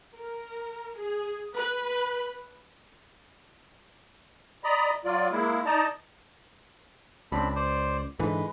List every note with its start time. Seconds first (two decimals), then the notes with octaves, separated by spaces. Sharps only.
0.15 A#4
0.97 G#4
1.56 B4
4.64 D5 D#5 A#5 B5
5.05 F#3 F4 D5
5.31 G#3 A#3 E4
5.66 D#4 D5 D#5 A5 A#5
7.32 C#2 C4 D4 B5
7.56 C5 D5
8.19 G#2 D3 E3 G#3 B4